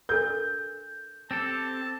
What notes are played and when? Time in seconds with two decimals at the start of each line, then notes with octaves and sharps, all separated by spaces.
0.09 D4 A4 A#4 G6
1.31 C4 G4 A4 A5